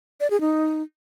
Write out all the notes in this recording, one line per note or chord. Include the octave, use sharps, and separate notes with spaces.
D5
G#4
D#4